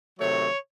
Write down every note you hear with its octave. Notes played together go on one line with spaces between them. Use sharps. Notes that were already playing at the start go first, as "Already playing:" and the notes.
C3 D#3 F#3 A3 C#5